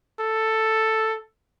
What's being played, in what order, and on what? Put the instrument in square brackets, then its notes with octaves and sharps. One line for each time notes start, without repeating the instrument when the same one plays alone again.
[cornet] A4